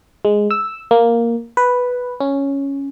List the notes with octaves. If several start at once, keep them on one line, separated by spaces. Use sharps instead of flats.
G#3
E6
A#3
B4
C#4